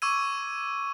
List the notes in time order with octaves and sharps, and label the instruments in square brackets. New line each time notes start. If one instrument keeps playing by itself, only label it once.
[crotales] C#6 D6 E6 G#6 D#7